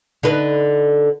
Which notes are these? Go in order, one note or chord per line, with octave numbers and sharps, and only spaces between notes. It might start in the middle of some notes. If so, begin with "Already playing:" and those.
D3 D#4 B4